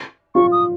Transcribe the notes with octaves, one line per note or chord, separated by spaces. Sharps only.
F4 C#6
D#6